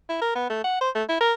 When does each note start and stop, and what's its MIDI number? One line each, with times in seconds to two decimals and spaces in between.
0.09 0.20 64
0.22 0.34 70
0.35 0.49 59
0.50 0.61 57
0.64 0.81 78
0.81 0.90 72
0.95 1.04 57
1.09 1.16 64
1.20 1.33 70